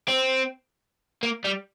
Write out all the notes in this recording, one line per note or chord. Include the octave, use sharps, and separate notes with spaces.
C4
A#3
G3